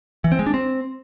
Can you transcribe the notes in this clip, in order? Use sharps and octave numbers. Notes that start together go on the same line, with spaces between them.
E3
C4
G#3
D4
C4